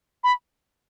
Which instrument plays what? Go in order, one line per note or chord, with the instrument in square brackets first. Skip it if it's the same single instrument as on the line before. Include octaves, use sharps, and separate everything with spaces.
[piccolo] B5